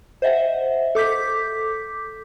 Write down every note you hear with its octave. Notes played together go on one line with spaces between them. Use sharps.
C5 D#5 E5 F#5
A4 D6 G6 B6